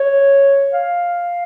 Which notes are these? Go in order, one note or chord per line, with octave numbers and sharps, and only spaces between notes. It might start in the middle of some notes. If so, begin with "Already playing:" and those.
Already playing: C#5
F5